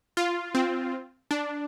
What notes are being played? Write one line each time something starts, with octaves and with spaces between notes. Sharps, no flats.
F4
C4
D4